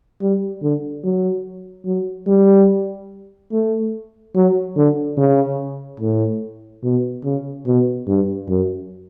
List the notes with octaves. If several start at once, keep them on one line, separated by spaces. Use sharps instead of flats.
G3
D3
F#3
F#3
G3
A3
F#3
D3
C#3
A2
B2
C#3
B2
G2
F#2